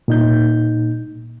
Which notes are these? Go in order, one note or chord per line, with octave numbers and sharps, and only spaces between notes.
A#2 D#4 G6